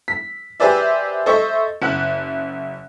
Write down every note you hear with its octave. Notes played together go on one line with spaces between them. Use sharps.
B6
G4 G#4 B4 C5 D5 E5
A4 C5 D#5 E5 C#6
F#1 F#5 F#6